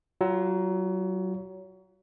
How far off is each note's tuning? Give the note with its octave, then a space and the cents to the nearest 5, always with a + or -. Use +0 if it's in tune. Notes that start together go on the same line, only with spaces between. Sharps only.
F#3 +25 F4 +0